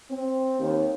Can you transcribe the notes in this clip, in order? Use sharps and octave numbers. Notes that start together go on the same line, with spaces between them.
C4
D#2